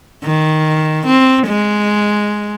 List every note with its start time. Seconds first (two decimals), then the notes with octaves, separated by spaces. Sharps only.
0.23 D#3
1.06 C4
1.47 G#3